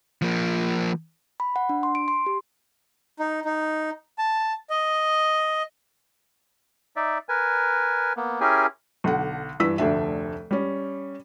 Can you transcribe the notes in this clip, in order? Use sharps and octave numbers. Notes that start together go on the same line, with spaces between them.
F3 A#3
B5
F#5
D4
C6
D7
C6
G4
D#4
D#4
A5
D#5
D#4 D5 E5
A#4 B4 G#5
A#3 B3
C#4 E4 G4 G#4 A#4 G#5
B1 D3 F#5
G2 E3 E6 B6
F1 D2 D4 E5
G3 C#4